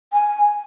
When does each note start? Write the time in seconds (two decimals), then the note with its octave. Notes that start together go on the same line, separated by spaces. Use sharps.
0.13 G#5